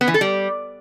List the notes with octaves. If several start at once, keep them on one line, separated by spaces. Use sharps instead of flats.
B3
E3
A4
G3